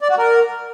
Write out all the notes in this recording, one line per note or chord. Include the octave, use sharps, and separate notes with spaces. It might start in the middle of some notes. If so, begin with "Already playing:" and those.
D5
F#4
A#4